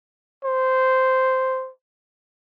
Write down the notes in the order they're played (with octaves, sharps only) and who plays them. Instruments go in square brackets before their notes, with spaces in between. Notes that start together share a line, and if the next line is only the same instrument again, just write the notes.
[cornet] C5